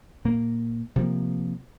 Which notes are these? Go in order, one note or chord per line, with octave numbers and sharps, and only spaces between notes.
A#2 A#3
C3 F3 A#3